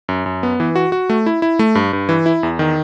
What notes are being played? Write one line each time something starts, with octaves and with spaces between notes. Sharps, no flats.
F#2
F#2
B3
E3
F#4
F#4
A3
E4
E4
A3
G2
G2
E3
E4
E2
D#3